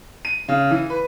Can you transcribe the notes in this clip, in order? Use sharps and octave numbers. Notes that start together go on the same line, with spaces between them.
D#7
C#3
E3
B4